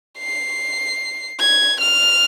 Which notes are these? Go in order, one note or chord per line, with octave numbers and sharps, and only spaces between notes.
C7
G#6
F6